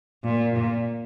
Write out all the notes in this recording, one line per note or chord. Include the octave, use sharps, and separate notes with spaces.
A#2
A#2